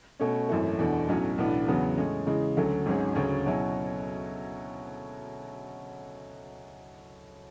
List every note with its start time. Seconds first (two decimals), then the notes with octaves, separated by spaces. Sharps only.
0.20 B2 A3 C#4
0.49 G#1 F#2 E3 A3
0.79 E2 B2 A3 D4
1.08 B1 A2 F#3 C#4 F#4
1.38 B1 A2 E3 B3 D4
1.68 E2 C#3 F#3 B3
1.97 A2 E3 G#3 C#4
2.26 C#3 E3 G#3
2.57 D2 D3 F#3 A3 C#4
2.86 G#1 G#2 F#3 C#4 G#4
3.15 D2 C#3 F#3 C#4
3.46 B2 F#3 C#4 E4 G#4